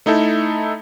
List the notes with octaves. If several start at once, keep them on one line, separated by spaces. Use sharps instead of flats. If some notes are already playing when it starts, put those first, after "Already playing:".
A3 D#4 E4 A4